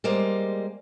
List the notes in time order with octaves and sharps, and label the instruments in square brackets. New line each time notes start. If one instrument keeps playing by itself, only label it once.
[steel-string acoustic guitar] G3 G#3 A#3 C5